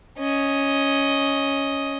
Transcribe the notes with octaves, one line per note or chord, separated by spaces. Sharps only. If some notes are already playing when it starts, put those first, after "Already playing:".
C#4 D#5